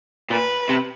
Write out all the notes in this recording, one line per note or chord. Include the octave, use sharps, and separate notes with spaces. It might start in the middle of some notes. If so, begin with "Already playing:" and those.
A#2 B4
C3